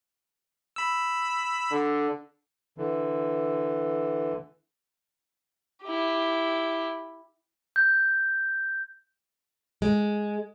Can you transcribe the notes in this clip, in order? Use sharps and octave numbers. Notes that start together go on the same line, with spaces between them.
B5 E6
D3
D3 E3
E4 G4
G6
G#3